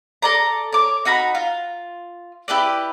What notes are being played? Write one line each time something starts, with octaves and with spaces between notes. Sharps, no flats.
A4 D5 A#5
C#5 D6
D#4 F#4 A#5 B5
F4
E4 G4 B4 D5